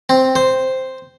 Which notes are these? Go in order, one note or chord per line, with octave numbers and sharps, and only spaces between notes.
C4
C5